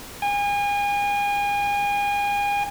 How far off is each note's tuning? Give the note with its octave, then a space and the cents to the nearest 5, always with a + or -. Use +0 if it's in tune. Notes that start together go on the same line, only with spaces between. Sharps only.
G#5 -35